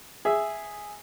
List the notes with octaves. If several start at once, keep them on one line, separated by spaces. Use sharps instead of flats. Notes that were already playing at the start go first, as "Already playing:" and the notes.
G#4 E5